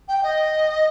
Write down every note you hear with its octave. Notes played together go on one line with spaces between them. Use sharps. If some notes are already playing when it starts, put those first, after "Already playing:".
G5
D#5